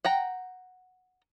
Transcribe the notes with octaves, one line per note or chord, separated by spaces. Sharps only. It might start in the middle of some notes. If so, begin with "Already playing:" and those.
F#5 G5 A#5